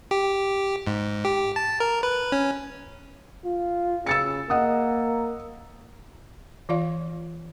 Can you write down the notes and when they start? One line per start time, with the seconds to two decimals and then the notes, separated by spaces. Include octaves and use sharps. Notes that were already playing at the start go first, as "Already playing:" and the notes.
0.11 G4
0.87 G#2
1.25 G4
1.56 A5
1.80 A#4
2.03 B4
2.32 C#4
3.45 F4
4.06 C#3 E6 A6 C#7
4.50 A#3 D#5 F#5 D#6
6.69 E3 F4 D5 F5